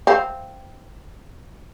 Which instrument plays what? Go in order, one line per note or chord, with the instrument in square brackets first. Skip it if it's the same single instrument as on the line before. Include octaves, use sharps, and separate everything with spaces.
[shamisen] C4 F5